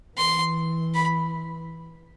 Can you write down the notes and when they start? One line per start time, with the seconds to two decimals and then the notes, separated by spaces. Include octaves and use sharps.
0.17 E3 C6
0.94 B5